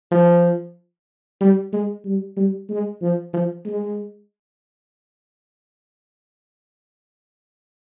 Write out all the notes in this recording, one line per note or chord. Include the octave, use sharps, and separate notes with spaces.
F3
G3
G#3
G3
G3
G#3
F3
F3
G#3